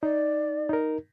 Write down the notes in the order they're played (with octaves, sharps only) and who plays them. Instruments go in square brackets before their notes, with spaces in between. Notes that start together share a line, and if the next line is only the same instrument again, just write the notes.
[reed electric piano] D#4 [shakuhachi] D5
[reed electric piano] D#4 A#4